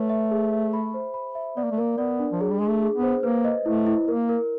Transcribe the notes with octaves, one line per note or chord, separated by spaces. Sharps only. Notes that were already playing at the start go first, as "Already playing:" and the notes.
Already playing: A3 B4 C#5
E5
G#4
E5
B5
C5
B5
E5
B3 D5
A#3
A3
A#3 A#4
B3 D5
D4
F3
F#3 G#4
G3
G#3 G#4
A3
G#4
B3
C5
A#3 B4
D#5
A3 E4
E4
A#3 A#4
A#4